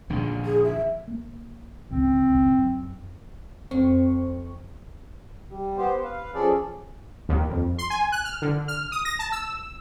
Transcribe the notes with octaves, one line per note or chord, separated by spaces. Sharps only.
A#1 D3 D#3
G#4
E5
A#3
G#1 C#2 D#3 C4
G#1 C#2
F#2
F2 C4 C#6
G3
B3 G4 C5
B4 F5
F3 C#4 G#4 A4 D5
D#2
F2
C6
G#5
F#6
F6
D3
F6
D#6
A#6
A5
E6